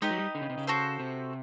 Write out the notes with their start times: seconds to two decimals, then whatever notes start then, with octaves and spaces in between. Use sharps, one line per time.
0.02 G#3 D#4 G4 B4 D#5
0.10 F#3
0.18 G3
0.35 D3
0.42 C#3
0.50 C3
0.58 C#3
0.67 F#4 A4 C5
1.00 C3